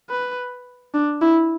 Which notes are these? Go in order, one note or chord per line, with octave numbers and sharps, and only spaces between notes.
B4
D4
E4